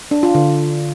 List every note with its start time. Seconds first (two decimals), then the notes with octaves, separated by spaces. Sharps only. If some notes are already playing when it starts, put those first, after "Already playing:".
0.11 D4
0.23 F4
0.35 D3